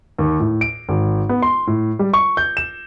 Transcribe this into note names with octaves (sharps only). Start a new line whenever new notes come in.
D#2
A2
D7
G#1
B3
C6
A2
G3
C#6
G6
E7